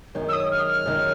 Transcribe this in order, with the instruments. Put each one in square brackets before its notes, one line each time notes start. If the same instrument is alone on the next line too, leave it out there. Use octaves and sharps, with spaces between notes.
[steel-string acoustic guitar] F#2 D#3 G#3 C#4
[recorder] E6
D#6
F6
F6
[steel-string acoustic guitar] F#2 D#3 G#3 C#4